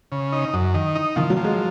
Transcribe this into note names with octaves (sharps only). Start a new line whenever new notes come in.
C#3
D#4
F#2
D#3
D#4
D#3 F3
F#3
F3
G#3